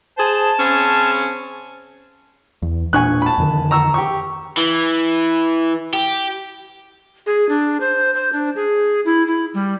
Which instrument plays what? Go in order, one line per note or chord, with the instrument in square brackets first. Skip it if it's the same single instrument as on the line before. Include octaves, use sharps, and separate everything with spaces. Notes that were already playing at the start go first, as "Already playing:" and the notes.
[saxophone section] G#4 C5 [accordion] A5
[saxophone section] C#3 C4 C#4
[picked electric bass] E2
[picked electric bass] E1 A#2 D4 [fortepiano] G#5 C#6 F#6
[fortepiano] A5 B5
[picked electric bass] F2 D3 D#3
[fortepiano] A#5 C#6 E6
G4 C#6
[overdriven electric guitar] E3
G4
[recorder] G#4
D4
C5
C5
D4
G#4
E4
E4
G3